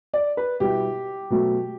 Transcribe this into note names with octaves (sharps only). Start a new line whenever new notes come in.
D5
B4
B2 G3 B3 E4 G4
B2 F#3 A3